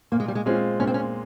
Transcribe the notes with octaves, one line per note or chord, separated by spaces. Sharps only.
A#2 A#3
G#3
G3
G#3
G#3 C4 C#4 F4
A#2 C#4
C4
C#4